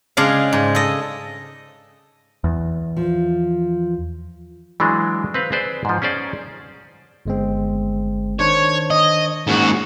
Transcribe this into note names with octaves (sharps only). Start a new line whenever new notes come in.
C#3 G#3 D4 F5
G#2
A4 D#5
E2
F3
E3 F#3 G#3 D4
C4 B4 F5
G#4 B4 C5 D5
G#2 F3
C#4 G#4 C5 D5
G1 G#3 C4
D#3 D4 C5 C#5
D#5
G#2 A#3 C#4 F#4